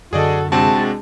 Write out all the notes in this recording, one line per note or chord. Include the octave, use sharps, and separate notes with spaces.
F#2 D3 F#4 G#4 A4 D5 D#5
C3 G#3 C4 D4 F#4 A5